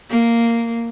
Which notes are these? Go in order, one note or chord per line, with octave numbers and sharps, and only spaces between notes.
A#3